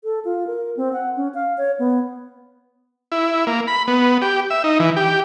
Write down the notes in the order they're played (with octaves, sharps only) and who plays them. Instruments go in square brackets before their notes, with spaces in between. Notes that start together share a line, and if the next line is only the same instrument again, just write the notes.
[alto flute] A4
F4
A#4
C4
F#5
C#4
F5
C#5
B3
[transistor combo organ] E4
A#3
B5
B3
G4
E5
D#4
E3
G4